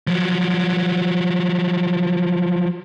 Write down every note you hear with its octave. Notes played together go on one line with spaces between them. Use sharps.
F3 F#3